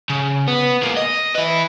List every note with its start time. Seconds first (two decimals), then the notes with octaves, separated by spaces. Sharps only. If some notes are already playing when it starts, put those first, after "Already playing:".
0.10 C#3
0.48 B3
0.83 G#3 A#3
0.96 D#5
1.34 E4 B4